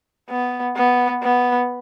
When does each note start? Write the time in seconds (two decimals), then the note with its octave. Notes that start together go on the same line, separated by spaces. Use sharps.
0.30 B3
0.76 B3
1.23 B3